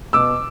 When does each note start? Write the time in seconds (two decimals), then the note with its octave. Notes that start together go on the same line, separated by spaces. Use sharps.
0.13 B2 D6 E6